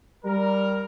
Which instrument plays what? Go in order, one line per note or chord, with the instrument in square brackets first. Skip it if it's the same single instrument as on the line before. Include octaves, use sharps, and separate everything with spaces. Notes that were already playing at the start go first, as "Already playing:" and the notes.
[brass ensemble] G3 A#4